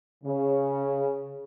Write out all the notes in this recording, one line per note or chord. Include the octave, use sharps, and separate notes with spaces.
C#3